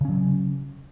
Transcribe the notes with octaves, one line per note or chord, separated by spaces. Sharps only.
C#3 F#3 C#4